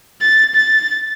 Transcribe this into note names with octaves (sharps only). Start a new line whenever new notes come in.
A6
A6